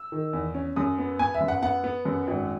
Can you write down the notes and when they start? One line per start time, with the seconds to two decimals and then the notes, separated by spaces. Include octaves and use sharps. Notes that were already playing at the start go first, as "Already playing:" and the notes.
Already playing: E6
0.12 D#3
0.33 E2
0.54 C#4
0.76 F#2 D#6
0.98 B3
1.19 B3 G#5
1.34 E5
1.41 F#2
1.48 F#5
1.62 B3 F#5
1.84 B3
2.05 F#2
2.27 G#1